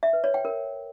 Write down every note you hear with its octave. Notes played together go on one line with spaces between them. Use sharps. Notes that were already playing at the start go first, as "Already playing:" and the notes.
E5
B4
C#5
G5
A#4